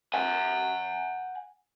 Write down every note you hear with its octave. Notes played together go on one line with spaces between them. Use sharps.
F#5 G#5